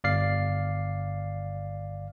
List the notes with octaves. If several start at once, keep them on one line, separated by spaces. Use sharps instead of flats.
G1 D5 F5 C7